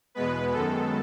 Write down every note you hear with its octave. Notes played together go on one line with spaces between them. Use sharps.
E2 B2 G#3 B3 B4
F#2 D#3 G#3 B3 A4